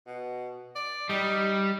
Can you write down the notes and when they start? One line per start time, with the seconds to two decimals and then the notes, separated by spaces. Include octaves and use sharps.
0.06 B2
0.75 D5
1.09 G3 D#4